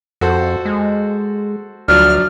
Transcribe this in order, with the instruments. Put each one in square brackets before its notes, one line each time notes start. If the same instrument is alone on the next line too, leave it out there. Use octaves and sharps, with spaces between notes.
[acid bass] F2 [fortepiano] F#4 A4 C5
[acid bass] G#3
[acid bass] D2 [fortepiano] F3 F#3 D4 [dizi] F6